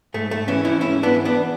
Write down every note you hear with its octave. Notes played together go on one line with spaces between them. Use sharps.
G#2 A3
A3
E3 C#4 E4
C#4 E4
G#2 C#4 E4
B3 D4
E3
B3 D4